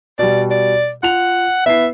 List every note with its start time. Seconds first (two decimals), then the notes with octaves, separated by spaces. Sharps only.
0.19 B2 G3 D5
0.51 D5
1.03 F4 F#5 F7
1.66 B3 E4 E5 C7